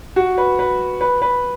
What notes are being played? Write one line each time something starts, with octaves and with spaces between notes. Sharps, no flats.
F#4
B4
B4
B4
B4